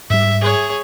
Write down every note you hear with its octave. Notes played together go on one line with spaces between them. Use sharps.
G#2 G3 E5
G#4 C#5